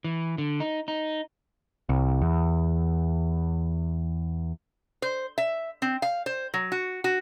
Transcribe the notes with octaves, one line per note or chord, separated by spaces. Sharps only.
E3
D3
D#4
D#4
C2
E2
C5
E5
C4
F5
C5
F#3
F#4
F#4